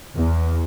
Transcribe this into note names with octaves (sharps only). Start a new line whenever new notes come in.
E2